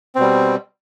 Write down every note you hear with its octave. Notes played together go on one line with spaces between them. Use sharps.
B2 G3 C4